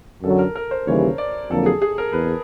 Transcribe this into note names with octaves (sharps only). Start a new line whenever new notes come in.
F#2 D3 F#3 A4
A#4
A#4
C5
D#2 C#3 E3 G3 C#5
D5
F2 D3 F#3 A#3 A4
G#4
G#4
A#4
E2 B4